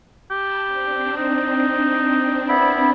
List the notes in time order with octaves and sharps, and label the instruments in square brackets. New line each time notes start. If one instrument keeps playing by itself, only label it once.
[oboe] G4 [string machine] A5 B5
[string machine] C4 D4
[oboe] D#4
[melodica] B3 E4 B5